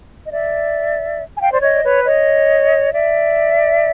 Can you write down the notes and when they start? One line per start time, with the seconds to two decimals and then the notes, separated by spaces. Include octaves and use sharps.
0.25 D#5
0.32 D5 E5
1.36 G#5
1.41 F5 G5
1.51 C5 D5
1.62 C#5 D#5
1.75 D5
1.84 B4 C#5
2.05 C#5 D#5
2.92 D5 E5